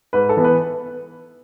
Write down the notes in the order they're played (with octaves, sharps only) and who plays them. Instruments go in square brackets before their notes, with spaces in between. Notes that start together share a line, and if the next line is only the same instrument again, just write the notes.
[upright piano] G#2 B4
A4
E3 B3
B4